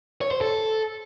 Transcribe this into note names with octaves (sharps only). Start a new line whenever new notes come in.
C#5
C5
A4